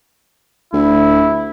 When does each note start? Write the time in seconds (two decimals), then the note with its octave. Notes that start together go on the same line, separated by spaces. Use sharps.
0.73 D2 E4